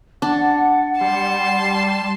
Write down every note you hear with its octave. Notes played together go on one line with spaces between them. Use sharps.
D4 F#5
G3 A5 C6